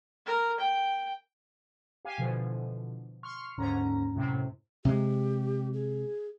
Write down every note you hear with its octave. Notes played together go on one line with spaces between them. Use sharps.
A#4
G5
G4 F5 G#5
B2 D3 E3 F3
C6 C#6 F6
D#2 G#2 D3 C#4 A#5
F#2 A2 C3
C3 G#3 G4
G#4